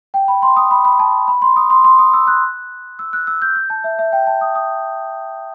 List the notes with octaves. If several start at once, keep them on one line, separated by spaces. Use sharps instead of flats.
G5
B5
C6
D#6
B5
B5
A5
B5
C6
D#6
C6
C6
D#6
E6
F#6
E6
F#6
E6
G6
G6
A5
E5
E5
G5
A5
D#6
D#6